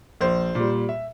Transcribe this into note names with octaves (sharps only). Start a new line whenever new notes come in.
A#1 C5
A#2 G3
E5